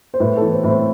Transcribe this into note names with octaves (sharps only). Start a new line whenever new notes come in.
C5
A2 B4
A4
E3
C5
A2
C5